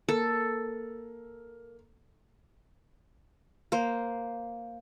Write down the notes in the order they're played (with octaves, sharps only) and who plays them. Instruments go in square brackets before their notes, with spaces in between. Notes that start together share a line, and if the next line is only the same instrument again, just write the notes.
[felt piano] A#3 [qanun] A4
[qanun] A#3 C5